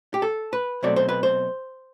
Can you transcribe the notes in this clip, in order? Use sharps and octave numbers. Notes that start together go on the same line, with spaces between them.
G4
A4
B4
B2 F#3 A3 C4 D5
C5
B4
C5